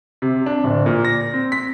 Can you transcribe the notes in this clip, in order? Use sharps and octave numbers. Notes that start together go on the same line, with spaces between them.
C3
D4
D1
A#2
A#6
C4
B6